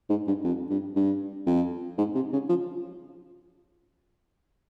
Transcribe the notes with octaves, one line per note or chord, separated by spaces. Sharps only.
G#2
G2
F2
G2
G2
F2
G#2
C3
C#3
F3